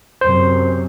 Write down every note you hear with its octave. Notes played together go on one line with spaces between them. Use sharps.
F#2 C3 C5